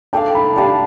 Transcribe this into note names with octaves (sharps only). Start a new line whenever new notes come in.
D4 A4 D5 F5 G5
B5
D4 G4 D5 F5 A5